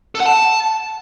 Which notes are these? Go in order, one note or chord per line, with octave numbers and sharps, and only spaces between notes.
A4
F#5
A5